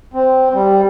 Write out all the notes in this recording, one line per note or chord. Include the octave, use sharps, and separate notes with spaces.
C4
G3